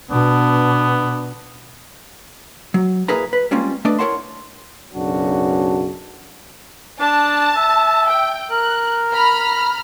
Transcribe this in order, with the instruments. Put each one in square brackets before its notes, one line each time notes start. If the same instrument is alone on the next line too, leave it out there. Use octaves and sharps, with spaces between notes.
[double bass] B2 D4 [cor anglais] B3
[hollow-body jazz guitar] F#3
A#2 E4 G#4 A#4 B4 A#5
B4
G3 G#3 A#3 C4 C#4 F4
A3 D4 B4 D5 D#5
E4 A#4 C#5 F#5 A5 C6
[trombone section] B1 F#2 C#3 D4 F#4
[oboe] D4 [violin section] A5
[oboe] E5
[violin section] G5
[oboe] A#4 [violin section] F#6
[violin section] A#5 B5 F6